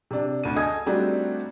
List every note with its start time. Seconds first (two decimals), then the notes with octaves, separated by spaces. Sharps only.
0.11 C3 D4
0.44 D2 D#7
0.56 A4 D#5 G#5 D#6 G#6
0.86 G3 A3 C4 D4 D#4 F#4